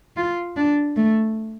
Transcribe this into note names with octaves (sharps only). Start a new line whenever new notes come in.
F4
D4
A3